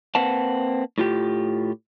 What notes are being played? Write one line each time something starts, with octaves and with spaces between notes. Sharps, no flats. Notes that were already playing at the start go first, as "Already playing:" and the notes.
A#3 C4 B4 F#5 A5
A2 F4 G4